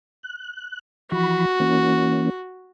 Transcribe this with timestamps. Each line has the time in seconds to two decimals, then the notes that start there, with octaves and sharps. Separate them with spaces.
0.23 F#6
1.12 E3 F3 F#4 B5
1.60 E3 A#3 C#4